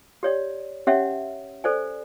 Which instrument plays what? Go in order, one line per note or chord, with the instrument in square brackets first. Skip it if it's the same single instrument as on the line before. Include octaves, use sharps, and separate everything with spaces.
[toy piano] G4 C#5 D5
C#4 G4 C#5 E5 F#5
A4 C5 D5 G#5